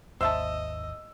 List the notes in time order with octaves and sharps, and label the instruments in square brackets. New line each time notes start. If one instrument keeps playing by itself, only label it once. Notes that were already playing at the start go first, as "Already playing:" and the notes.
[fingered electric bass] G#1 D#2 [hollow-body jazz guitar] C5 E5 A5 [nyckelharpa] D#5 [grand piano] E6